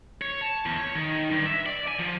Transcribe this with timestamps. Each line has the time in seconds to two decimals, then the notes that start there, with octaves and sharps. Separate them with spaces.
0.22 C#5
0.41 A5
0.66 E2
0.78 C#5
0.95 D#3
1.31 G2
1.47 E5
1.66 D5
1.88 G#5
1.99 F3